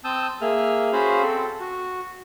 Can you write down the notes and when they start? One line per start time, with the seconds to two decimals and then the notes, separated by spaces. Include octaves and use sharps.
0.04 C4 A5 D#6 E6 G6
0.42 A#3 G#4 E5 F6
0.93 C#4 F#4 G#4 C5 F5 B5
1.23 C4 A4
1.61 F#4